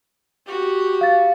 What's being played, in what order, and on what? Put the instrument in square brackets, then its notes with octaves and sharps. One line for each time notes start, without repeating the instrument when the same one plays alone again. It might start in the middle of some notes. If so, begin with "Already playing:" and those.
[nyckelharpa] F#4 G4
[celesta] F5 A6